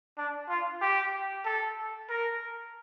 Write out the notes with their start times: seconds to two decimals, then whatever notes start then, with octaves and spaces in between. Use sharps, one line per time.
0.18 D4
0.49 F4
0.81 G4
1.46 A4
2.10 A#4